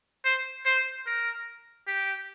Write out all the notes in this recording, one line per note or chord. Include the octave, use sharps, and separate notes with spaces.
C5
C5
A#4
G4